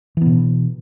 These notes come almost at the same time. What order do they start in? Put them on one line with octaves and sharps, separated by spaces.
E3 B3 B2